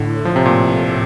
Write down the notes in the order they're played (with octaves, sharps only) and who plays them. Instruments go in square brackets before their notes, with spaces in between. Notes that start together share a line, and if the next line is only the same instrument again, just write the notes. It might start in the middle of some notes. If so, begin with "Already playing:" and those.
Already playing: [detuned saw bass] A2 [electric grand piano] D3
[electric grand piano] F3
C3
A#2
[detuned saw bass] A2